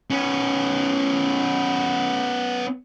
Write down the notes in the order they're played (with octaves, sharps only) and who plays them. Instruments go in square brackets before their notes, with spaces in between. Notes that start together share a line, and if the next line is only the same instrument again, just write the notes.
[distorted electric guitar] B3 C#4